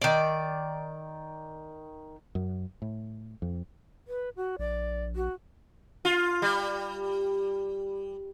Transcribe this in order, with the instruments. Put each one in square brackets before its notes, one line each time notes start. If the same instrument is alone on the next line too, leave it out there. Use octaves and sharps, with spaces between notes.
[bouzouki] D#3 D5
[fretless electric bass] F#2
A2
F2
[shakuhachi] B4
F#4
[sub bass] A#1 [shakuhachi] D5
[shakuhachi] F#4
[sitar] F4
G3